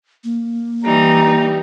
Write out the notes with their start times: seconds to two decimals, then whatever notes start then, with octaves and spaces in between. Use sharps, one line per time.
0.24 A#3
0.84 E3 G3 D#4 A#5